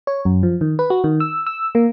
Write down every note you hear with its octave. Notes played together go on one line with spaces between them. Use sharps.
C#5
F#2
F3
D#3
B4
F#4
D#3
E6
E6
A#3